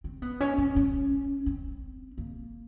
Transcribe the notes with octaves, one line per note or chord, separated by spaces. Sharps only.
C4
B3
C#4
C#4
C#4
C4
A#3